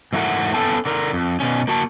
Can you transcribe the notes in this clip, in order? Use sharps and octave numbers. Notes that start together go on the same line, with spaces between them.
G#2 E3 A3 F#4 A#4 F#5
B3 C#4 A4 F5 G5 A5
D3 A#4
F2
B2 C#4
A#3 F#4 A5